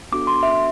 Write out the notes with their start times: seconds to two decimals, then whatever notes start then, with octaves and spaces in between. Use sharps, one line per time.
0.12 B3 D4 F#4 A4 D6
0.27 C6
0.43 E5